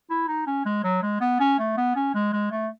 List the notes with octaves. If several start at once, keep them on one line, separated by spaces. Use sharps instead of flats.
E4
D#4
C#4
G#3
F#3
G#3
B3
C#4
A3
B3
C#4
G#3
G#3
A3